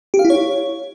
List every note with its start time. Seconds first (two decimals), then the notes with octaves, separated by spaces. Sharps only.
0.14 G4
0.19 F5
0.25 E4
0.30 C#5